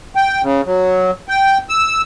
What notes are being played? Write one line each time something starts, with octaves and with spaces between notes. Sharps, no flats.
G5
C#3
F#3
G5
E6